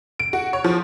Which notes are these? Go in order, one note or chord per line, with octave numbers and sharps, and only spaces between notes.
D7
F#4
C#5
F3